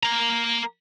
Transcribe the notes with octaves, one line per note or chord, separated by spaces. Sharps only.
A#3 A#5